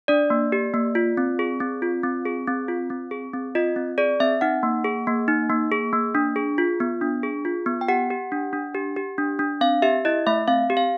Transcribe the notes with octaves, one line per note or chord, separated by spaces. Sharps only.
D4 D5
A#3
G4
A#3
F4
C4
G#4
C4
F4
C4
G#4
C4
F4
C4
G#4
C4
F4 D#5
C4
G#4 D5
C4 E5
D#4 F#5
A#3
G#4
A#3
D#4
A#3
G#4
A#3
D4
G#4
F4
B3
D4
G#4
F4
B3
G5
G4 F#5
G4
D4
D4
G4
G4
D4
D4
C4 F5
G4 E5
E4 D#5
A3 E5
C4 F5
G4
F5